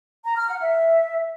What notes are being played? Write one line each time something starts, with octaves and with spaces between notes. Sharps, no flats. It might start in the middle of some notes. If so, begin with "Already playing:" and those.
A#5
F6
F#5
E5